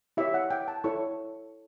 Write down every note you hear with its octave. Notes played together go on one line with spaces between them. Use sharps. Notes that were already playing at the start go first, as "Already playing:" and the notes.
E4 G4 C#5 E5
F#5
G5
A5
E4 A4 C#5 C#6